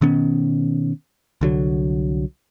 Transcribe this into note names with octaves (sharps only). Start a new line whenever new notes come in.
B2 D#3 B3 C#4
C2 D3 F#3